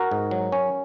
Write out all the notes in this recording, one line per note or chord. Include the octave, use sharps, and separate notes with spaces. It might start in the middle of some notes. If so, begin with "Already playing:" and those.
Already playing: F#4 A#4
G#2
F#3
C#4